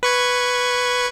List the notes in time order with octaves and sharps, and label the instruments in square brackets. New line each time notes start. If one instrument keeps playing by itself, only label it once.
[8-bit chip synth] B4 C#6 G#6